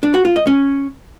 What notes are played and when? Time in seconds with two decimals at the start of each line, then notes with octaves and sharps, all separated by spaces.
0.03 D4
0.14 F#4
0.25 F4
0.36 D#5
0.47 C#4